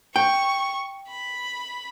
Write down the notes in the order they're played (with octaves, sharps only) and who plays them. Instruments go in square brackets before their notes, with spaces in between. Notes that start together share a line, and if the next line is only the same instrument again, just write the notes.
[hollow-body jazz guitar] G5 [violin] C#6
[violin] B5